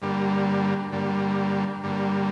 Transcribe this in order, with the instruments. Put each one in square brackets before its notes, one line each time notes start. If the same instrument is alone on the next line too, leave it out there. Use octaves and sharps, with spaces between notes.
[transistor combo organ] G2 D3 G3 A#3
G2 D3 G3 A#3
G2 D3 G3 A#3